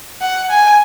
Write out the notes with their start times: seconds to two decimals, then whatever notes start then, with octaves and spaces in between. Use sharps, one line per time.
0.21 F#5
0.50 G#5